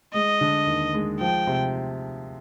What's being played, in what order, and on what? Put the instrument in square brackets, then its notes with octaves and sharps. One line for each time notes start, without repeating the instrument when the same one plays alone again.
[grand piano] G#3 [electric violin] D#5
[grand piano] D3
D#2
G#3
[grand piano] F3 [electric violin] G5
[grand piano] C3